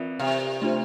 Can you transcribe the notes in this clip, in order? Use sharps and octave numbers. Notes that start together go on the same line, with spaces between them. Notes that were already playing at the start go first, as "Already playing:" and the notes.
Already playing: E3 C4 F4 A#4 D5
C3
A3 D4 F4 C5